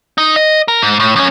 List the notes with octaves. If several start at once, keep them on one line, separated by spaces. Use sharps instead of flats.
D#4
D#5
A#4
G#2
A2
F#2 C#4